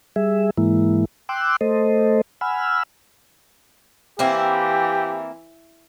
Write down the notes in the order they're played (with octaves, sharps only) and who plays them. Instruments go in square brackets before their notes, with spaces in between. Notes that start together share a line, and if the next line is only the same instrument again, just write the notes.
[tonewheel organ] G3 G#4 E5
G#2 E3 G#3 A#3 E4
G5 C6 D6 E6 F#6
A3 A4 C5 D#5
F#5 G#5 B5 E6 F6
[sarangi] E3 [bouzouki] A#3 C4 E4 [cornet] G4